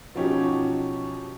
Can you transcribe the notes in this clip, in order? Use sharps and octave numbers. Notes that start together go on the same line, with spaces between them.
B2 F3 F#3 C#4 D#4 G4